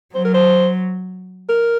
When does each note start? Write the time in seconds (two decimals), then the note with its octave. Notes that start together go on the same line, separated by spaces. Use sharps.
0.15 F#3 C5
0.25 A#4
0.34 C5
1.49 A#4